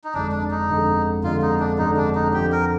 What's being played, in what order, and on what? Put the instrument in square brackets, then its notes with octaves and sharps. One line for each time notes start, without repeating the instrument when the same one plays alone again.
[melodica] D#4
[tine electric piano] G1 F2 D3 G#3 [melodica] D4
[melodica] D4
D#4
[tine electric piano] G1 F2 D3 G#3
[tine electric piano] G1 F2 D3 G#3 [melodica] F4
[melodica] D#4
D4
[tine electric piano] G1 F2 D3 G#3 [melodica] D#4
[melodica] D4
D#4
[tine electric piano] F2 D3 F3 [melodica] G4
[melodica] A#4